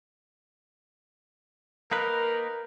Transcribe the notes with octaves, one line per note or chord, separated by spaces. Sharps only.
A#3 D#4 A#4 B4